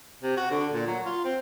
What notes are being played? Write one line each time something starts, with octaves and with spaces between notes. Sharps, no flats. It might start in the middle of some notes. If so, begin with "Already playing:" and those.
C3
F#4
D3
A#2
F#3
F4
C4